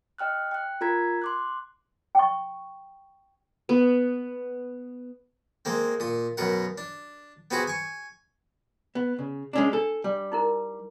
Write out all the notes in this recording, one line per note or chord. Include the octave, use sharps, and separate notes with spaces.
D#5 G5 F6 F#6
G5 F#6
F4 A#4 A#5 G#6 B6
C6 D6 F#6
G5 C#6
B3
G#3 A#3 C4
A#2 D#6
F#2 B2 A#4 F#5
D4
B3 C4 F#4 G#4
G#5 C#6
B3
C#3
G#3 C#4 D4
D4 A4
G3
D#4 E4 A#4